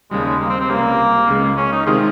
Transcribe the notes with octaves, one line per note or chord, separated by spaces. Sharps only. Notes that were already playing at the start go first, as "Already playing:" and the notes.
D#2 C#3 G3 G#3
G#3
A#3
C4
C4
C#2 C3 G3 A#3 C#4
C#2 C#3 G#3
C#4
D#4
C3 D#3 G#3 F4